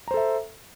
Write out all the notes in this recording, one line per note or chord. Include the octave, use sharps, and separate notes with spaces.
A4 C5 E5 A#5